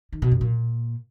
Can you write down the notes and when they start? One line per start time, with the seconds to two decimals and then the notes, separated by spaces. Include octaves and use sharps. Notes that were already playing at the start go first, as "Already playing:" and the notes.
0.13 D#3
0.22 B2
0.31 F#2
0.41 A#2